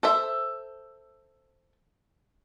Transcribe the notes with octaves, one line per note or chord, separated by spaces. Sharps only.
A4 C5 E5